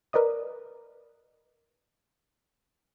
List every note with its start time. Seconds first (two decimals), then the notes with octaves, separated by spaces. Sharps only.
0.13 A#4 B4 D5 D#5 D#6